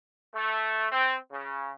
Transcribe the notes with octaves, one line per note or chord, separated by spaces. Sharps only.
A3
C4
C#3